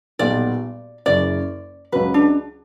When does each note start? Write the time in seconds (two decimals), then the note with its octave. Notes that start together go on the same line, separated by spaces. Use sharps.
0.19 B1 A#2 G3 B3 D5
1.06 F#1 F#2 C#3 D5
1.92 C#2 C#3 F#3 B4
2.14 D4